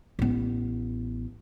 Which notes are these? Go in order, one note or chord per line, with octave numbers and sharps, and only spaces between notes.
A1 B3